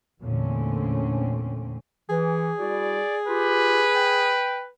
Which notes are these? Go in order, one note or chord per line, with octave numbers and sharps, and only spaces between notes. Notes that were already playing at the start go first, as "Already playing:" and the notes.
E2 A#2 D3 A3 C4 C#4
E3 G#4
G3 E4 F#4 D5
F4 G4 B4
G5